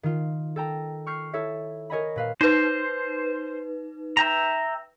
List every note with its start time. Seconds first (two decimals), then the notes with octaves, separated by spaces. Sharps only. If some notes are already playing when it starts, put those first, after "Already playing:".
0.03 D#3 F4
0.56 A4 G5 A#5
1.06 C#6 F6 G6 C7
1.33 E4 A4 C#5 E5
1.90 A#4 C#5 D#5 G#5 A#5 B5
2.16 A#2 B4 F5
2.41 D#4 B4 C5
4.17 E5 G5 A#5